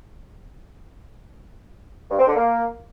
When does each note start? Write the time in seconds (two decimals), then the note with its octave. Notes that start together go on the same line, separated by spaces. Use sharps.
2.10 G2
2.19 C4
2.28 D3
2.36 A#3